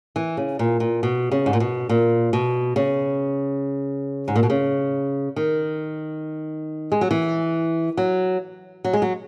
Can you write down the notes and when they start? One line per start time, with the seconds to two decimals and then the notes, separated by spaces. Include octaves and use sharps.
0.16 E3
0.37 C#3
0.59 A#2
0.80 A#2
1.03 B2
1.31 C#3
1.46 G#2
1.53 A#2
1.60 B2
1.89 A#2
2.33 B2
2.76 C#3
4.28 G#2
4.35 A#2
4.43 B2
4.50 C#3
5.36 D#3
6.92 G#3
7.01 F#3
7.11 E3
7.97 F#3
8.84 F#3
8.93 G#3
9.02 F#3